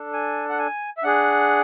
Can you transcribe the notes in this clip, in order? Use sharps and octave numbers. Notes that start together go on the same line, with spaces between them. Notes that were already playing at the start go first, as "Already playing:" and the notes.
Already playing: D4 A4
G#5
F#5
G#5
E5
D4 G#4 F#5